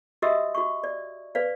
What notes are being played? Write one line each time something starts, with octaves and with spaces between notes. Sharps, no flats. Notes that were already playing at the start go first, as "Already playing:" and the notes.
F#4 G4 D#5 E5 D#6 E6
F#4 C#6
D5
B4 D5 F5